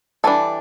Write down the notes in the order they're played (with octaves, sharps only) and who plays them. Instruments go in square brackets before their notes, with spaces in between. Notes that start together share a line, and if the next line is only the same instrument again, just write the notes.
[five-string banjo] E3 G3 D4 A4 A5